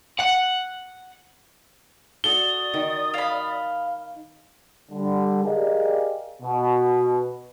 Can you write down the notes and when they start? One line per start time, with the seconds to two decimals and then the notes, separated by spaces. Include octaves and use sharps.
0.20 F#5
2.24 F#4 A4 D5 D#6 G7
2.74 D#3
3.14 F5 B5
4.91 D3 G3
5.44 G4 G#4 A#4 D5 D#5 F5
6.42 B2